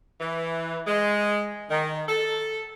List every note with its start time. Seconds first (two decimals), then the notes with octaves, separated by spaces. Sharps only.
0.21 E3
0.87 G#3
1.70 D#3
2.09 A4